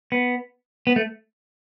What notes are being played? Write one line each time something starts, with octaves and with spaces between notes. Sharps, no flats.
B3
B3
A3